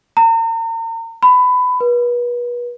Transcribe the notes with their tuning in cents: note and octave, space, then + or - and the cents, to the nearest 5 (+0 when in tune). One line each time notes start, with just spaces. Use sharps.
A#5 -40
B5 +20
B4 -35